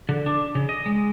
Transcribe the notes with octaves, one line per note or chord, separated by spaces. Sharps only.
D3
D4
C#3
D#5
G#3